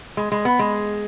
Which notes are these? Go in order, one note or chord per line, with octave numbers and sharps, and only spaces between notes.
G#3
G#3
B3
G#3